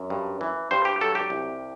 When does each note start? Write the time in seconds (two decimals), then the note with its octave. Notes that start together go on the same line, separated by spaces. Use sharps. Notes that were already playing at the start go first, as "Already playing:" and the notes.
Already playing: F#2
0.10 G2
0.41 E3
0.71 G2 C5
0.85 G4
1.01 F#3 A4
1.15 G4
1.30 C2